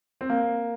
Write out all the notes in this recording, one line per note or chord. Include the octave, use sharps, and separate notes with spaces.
C4
A#3